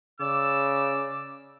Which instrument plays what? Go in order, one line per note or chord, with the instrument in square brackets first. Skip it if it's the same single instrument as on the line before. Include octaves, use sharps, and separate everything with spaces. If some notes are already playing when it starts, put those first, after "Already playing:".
[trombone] C#3 [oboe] D5 [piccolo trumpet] E6